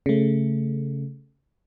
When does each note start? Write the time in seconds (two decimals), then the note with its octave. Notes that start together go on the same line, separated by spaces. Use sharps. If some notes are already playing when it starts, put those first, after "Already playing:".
0.06 C#3 A3